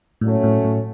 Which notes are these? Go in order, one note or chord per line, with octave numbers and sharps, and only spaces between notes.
A2 F#3 A3 C#4
A2
A2